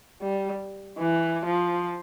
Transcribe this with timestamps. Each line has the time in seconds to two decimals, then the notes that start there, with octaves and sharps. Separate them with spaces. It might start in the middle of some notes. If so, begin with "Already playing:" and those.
0.21 G3
0.99 E3
1.46 F3